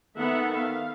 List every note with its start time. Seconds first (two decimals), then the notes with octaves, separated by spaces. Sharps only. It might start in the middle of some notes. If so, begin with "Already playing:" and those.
0.18 D#3 B3 A4 E5 F#5
0.57 F5